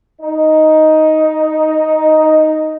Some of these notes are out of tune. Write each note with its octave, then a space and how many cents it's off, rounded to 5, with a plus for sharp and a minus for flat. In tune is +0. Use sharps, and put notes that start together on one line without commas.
D#4 +5